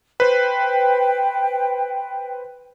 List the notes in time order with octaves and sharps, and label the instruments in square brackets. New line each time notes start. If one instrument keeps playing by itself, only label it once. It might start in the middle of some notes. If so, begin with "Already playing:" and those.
[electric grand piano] B4 C5 [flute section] G5